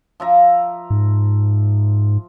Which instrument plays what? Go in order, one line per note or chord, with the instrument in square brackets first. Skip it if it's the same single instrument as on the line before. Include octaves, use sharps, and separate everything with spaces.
[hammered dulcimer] F3 E5 A#5
[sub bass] G#2